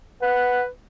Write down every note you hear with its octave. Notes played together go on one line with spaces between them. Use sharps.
B4 F#5